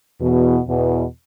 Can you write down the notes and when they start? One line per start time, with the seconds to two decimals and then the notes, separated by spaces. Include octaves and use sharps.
0.20 E2 B2
0.67 E2 B2